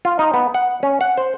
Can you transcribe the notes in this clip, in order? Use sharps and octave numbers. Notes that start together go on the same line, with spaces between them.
F4
D#4
B3
F#5
C#4
F#5
C5